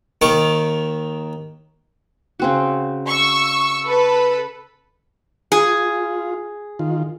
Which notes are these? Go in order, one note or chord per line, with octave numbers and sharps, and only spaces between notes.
D#2 D#3 C#6 D6
C#3 C4 F#4
C#6 E6
A4 B4
F4 G#4
D#3 F4